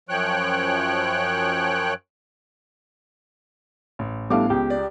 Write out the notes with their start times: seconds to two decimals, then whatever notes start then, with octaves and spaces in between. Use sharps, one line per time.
0.09 F#2 F3 C#5 G5 F#6
3.99 A1
4.30 G3 A3 B3 D4 E4 F5 D6
4.50 C#2 G4
4.70 D5